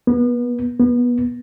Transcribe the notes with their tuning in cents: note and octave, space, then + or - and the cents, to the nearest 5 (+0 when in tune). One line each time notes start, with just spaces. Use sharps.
B3 -30
B3 -25